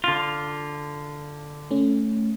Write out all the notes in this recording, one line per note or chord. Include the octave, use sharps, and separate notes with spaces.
D3 F4
A3 C#4